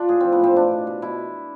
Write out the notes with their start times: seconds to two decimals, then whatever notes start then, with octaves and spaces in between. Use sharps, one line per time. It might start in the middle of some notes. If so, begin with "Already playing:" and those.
Already playing: D4 F4
0.09 A2 G#4
0.20 F3 C4
0.32 B3
0.40 A2 C4
0.55 B2 D4
0.71 B2
0.87 B2
1.02 B2 E4